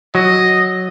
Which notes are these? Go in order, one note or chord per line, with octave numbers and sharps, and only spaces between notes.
F#3 D#5